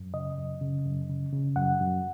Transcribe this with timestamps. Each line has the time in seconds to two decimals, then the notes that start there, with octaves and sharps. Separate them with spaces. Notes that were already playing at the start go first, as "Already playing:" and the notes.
Already playing: F#2
0.14 C#3 D#5
0.38 F#2
0.61 C#3
0.86 F#2
1.09 C#3
1.32 C#3
1.56 F#2 F#5
1.81 F#2